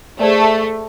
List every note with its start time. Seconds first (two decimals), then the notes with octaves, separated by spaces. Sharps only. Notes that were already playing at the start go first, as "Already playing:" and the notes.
0.20 A3 G#4 C5 D5